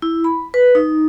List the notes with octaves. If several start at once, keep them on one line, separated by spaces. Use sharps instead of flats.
E4
B5
B4
D#4